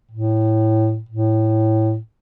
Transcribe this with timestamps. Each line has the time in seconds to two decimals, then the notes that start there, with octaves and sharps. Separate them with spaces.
0.12 A2
1.09 A2